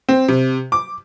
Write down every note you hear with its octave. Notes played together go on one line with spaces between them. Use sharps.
C4
C3
D6